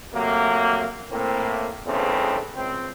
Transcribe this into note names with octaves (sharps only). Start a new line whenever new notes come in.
C3 F#3 A3 A#3
A2 A#3 C4
E2 G2 C#3 A3 B3 C4
C#2 C4